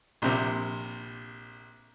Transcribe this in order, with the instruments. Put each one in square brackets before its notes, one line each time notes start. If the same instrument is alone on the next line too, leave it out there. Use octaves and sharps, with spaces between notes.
[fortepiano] A#1 C3